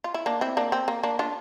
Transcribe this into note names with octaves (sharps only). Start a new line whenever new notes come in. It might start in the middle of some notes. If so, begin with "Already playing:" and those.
F4
E4
A#3 D4
C4 E4
A#3 D4
C4
A#3
A#3 D4
D4 F4